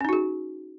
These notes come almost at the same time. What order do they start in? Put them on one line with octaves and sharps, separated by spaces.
C#4 D#4 F#4 G#4